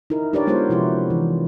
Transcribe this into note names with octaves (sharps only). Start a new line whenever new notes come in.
D#4 E4 A#4
D4 G4 A#4 B4 C#5 D5
G#3 B3 F4 A#4 C5 C#5
C3 F3 E4 F#4 B4
E3